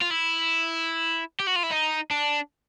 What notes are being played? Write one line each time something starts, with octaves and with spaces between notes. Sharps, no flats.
F4
E4
G4
F#4
F4
E4
D#4
D4